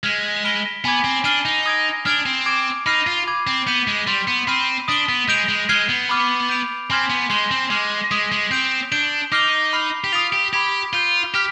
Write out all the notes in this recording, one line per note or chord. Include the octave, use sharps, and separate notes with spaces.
G#3 F6 G#6 B6 F7
B5 F6 B6 D7 G7
B3 G#5 B5 D6 G#6
C4
D4 F6 C7 D#7 G7
D#4
D#6 G#6 D7
D4 F6 G#6 D7 F7
C4
D6 G#6 D7
D#4 B5 F6 C7 D#7
F4
B5 D6 G#6
C4
B3 G6 B6 D#7 G7
G#3
G3 C6 G6 B6 D7
B3
C4 B5 F6 C7 D#7
D4 D#6 B6 D7 G7
B3
G#3 G6 D7 F7
G#3
G#3 F6 G#6 C7 D#7 G7
B3
B5 D6 F6
G6 D7 F7
C4 G#5 C6 F6 G#6 B6
B3
G#3 C6 G6 C7 G7
C4
G#3 D6 F6 C7
G#3 D#6 B6 D7
G#3
C4 G6 D7 F7
D4 G6 D7 G7
D#4 D6 F6 C7 G7
B5 F6 C7
G4
F4 D#6 B6 D7 F7
G4
G4 B5 D6 G#6
F4 G6 D7 G7
G4 D6 F6 B6 F7